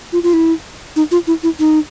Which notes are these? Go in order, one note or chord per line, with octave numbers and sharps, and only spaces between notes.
F4
F4
E4
D#4
F4
E4
E4
D#4